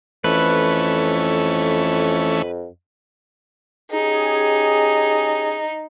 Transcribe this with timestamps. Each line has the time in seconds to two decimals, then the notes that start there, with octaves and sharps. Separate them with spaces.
0.24 F2 E3 A3 C#4 B4
3.91 C#4 D#4 G4 G#4